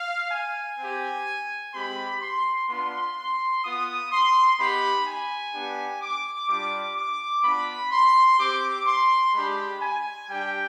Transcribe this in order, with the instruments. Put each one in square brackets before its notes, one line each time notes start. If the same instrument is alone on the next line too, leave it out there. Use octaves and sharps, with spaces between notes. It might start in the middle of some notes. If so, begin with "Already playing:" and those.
Already playing: [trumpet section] F5
G#5
C4 G4
G#3 C4 G4 B5
C6
B3 D4 F4 C6
B3 F4 D#6
C6
B3 D#4 G4 B5
G#5
B3 D4 G4
D6
G3 D4 F4 D6
D6
B3 D4 F4 B5
C6
C4 G4 D6
C6
G#3 D4 G4 B5
G#5
G3 D4 G4 G5